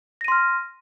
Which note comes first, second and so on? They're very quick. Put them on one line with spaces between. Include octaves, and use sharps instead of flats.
A#6 D#7 C6 F6